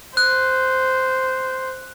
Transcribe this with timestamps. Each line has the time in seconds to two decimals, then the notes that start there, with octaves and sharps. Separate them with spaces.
0.17 C5 F#6